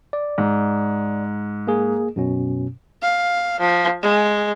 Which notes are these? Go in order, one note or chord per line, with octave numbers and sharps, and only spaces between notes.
D5
G#2
A#3 G#4
F#2 B2 C#4
F5
F3
G#3